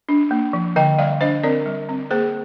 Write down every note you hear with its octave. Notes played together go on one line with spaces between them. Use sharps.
D4
A#3
F3
D3 D#5 G5
G3 D5 F5
D4 C5 D#5
C4 A#4 D5
G3
C4
A#3 G#4 C5